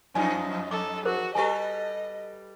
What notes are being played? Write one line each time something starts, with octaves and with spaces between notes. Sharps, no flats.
F2 F3 C#4 D#4 D5 G#5
A4 D6
F#4 G#4 A#4 C5
G3 G4 A4 B4 D#5 G#5